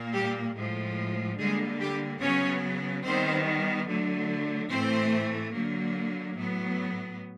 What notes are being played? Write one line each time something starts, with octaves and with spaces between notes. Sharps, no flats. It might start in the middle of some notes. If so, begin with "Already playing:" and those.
Already playing: A#2 A#3
G3 G4
A2 F3 G#3
D3 G3 G#3 A#3 G#4
G3 G4
C#3 F#3 B3 C#4 C#5
D#3 G3 B3 C4 C5
D3 F#3 A3
A2 E3 A3 C4 C5
D3 F#3 A#3
A2 F#3 B3